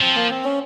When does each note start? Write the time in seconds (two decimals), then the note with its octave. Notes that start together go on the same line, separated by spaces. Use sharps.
0.01 F3 C4
0.15 A#3
0.30 C4
0.44 C#4